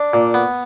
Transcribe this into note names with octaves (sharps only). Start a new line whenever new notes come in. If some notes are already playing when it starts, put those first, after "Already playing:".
Already playing: D4
A#2
B3